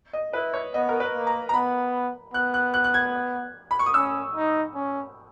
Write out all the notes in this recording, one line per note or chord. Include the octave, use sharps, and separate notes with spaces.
D#5
E4 B4
C#5
B3 D#5
A#4
B4
A#3
A#5
A#5
B3 B5
B3 F#6
F#6
F#6
F#6
G#6
B5
C#6
D#6
C#4 E6
D#4
C#4